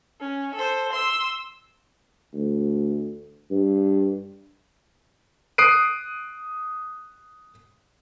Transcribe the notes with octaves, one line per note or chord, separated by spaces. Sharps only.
C#4
A4 C5
C6 E6
D2
G2
D#6 F#6 C7 D7 D#7